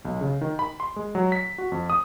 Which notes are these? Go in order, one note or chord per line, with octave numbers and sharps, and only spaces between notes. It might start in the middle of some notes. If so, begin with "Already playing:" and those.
B1
C#3
D#3
B5
C6
G#3
F#3
B6
F#4
F2
D#6